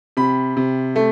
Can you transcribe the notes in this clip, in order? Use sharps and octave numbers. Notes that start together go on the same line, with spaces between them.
C3 B5
C3
A3